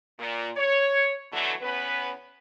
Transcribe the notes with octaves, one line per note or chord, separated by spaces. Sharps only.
A#2
C#5
B2 D3 E3 F#3 A3
E2 B3 C#4 B4